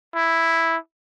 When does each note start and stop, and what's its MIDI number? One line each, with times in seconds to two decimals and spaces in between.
0.15 0.77 64